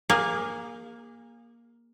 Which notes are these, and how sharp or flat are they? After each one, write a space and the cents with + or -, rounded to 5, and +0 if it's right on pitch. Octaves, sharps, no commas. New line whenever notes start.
A#3 +10 G#4 -25 F5 +0